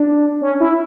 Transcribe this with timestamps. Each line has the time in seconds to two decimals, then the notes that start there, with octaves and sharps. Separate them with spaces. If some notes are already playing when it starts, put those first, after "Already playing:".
Already playing: D4
0.41 C#4
0.60 E4